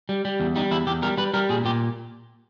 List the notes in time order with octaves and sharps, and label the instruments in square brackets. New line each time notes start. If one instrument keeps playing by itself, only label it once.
[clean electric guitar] G3
G3
E2
G3 D#4
E2 E4
E2 G4
G3 A#4
G3 B4
G3 A#4
A#2 G#4
A#2 G4